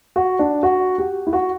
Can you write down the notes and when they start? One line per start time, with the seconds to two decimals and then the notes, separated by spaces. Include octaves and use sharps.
0.16 F#4
0.39 D4
0.63 F#4
0.98 G4
1.27 E4
1.33 F#4